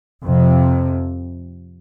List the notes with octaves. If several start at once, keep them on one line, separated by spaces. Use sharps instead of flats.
F2 C3